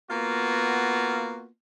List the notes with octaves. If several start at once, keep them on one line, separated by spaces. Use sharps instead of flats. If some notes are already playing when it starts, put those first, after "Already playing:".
A#3 B3 F4 F#4